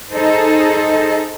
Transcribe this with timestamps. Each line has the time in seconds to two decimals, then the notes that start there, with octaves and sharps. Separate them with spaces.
0.11 D#4 G#4 A4 C5 D#5